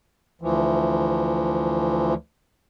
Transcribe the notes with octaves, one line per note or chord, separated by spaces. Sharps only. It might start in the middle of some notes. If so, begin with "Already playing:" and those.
D2 E3 F3